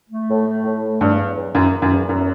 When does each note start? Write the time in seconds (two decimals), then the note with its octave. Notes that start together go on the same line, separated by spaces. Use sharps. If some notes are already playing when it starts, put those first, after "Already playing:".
0.10 A3
0.29 A2
0.46 A3
0.64 A2
0.82 A3
1.01 E2 G2
1.18 F#3
1.36 E2
1.55 F#2 F#3
1.73 F#3
1.82 F#2
1.91 E2
2.09 F#2 F#3